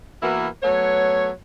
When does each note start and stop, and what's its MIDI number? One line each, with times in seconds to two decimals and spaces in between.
0.22 0.47 52
0.22 0.47 58
0.22 0.47 59
0.22 0.47 64
0.22 0.47 66
0.22 0.47 70
0.63 1.30 54
0.63 1.30 57
0.63 1.30 59
0.63 1.30 73